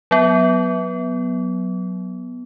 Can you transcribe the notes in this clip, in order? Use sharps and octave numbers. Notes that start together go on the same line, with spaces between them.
F#3 B3